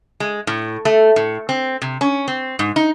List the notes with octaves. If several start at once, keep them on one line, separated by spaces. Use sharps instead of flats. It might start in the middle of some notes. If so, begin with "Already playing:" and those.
G#3
A2
A3
A2
C4
C3
C#4
C4
G#2
D#4